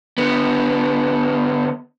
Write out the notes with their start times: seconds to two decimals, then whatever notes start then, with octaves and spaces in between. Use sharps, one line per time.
0.18 D3 B3